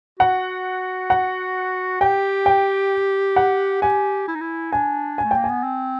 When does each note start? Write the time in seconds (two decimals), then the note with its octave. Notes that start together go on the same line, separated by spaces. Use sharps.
0.19 F#4 F#5
1.10 F#5
2.01 G4 G5
2.46 G5
3.36 F#5
3.82 G4 G#5
4.28 E4
4.35 D#4
4.41 E4
4.72 D4 G#5
5.18 G#5
5.24 A3
5.31 G5
5.37 A#3
5.44 G#5
5.50 B3
5.64 C4